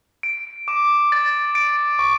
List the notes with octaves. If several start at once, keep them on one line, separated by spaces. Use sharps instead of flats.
D7
D6
A6
D7
C#6